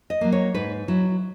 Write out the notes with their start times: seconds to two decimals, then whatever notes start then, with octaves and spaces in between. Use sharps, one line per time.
0.10 D#5
0.21 F#3 A#3
0.32 C#5
0.54 G#2 B4
0.88 F#3 E4